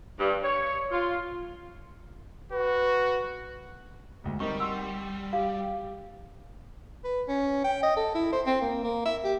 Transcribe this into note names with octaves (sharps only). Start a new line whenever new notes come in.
G2
C#5
F4
F#4 B4
D2 G#2
G3 C4 D#4 A#4 C#6
F#5 C6 E6
G4 F5
B4
C#4
G5
D#5
A4
E4
C5
C4
A#3
A#3
E5
G4